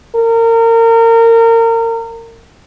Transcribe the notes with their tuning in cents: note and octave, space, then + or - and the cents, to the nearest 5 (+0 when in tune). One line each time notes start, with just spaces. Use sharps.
A#4 -30